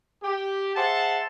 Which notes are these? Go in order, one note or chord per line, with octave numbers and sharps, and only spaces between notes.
G4
G#4 C5 E5 F#5 A5